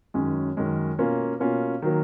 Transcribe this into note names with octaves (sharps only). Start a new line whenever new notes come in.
F#2 D#3 G#3 C#4
F#2 D#3 G#3 C#4
B2 A#3 C#4 F4
B2 A#3 C#4 F4
D#3 F#3 A#3